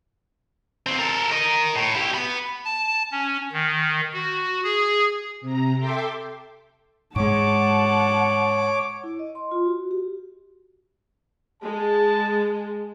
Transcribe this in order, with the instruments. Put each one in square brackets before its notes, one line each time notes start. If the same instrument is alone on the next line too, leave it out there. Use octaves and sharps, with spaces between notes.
[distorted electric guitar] D#2 C4
A4 A#4
A#4 D#5
A2
E4 G4
B3 B5
[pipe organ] A5
C#4
D#3
F#4
G#4
[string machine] C3 A#5
A4 E5 G5 C6 D6
[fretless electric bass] G#2 G#3 [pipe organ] C#5 D6 [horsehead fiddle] F#5 A5
[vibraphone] E4
D#5
C6
F4
F#4
G4
[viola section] G#3 [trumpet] A5